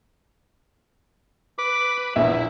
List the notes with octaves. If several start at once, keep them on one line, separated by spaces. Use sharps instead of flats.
B4 D6
A#1 E2 E4 B4 E5